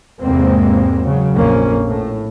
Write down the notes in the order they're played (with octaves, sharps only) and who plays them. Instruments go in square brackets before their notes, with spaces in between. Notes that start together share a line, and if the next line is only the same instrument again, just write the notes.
[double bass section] E2 G#2 C3 G#3 A#3 C4
C#3 F#3
A#1 F2 A#3 C#4
A2